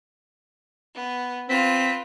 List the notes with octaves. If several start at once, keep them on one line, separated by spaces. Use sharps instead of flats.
B3
C4 F4 B4 B6